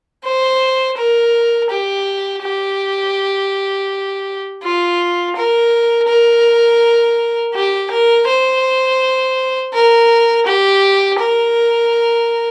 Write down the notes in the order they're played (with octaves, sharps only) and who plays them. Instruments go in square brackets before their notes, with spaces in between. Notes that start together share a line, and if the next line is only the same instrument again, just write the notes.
[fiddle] C5
A#4
G4
G4
F4
A#4
A#4
G4
A#4
C5
A#4
G4
A#4